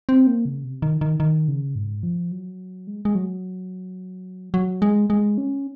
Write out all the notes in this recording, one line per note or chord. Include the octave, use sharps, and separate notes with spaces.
C4
A#3
C#3
C3
D#3
D#3
D#3
C#3
G#2
F3
F#3
G#3
G#3
F#3
F#3
G#3
G#3
C#4